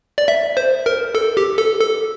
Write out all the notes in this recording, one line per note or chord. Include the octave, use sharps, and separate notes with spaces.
D5
E5
C5
A#4
A4
G4
A4
A4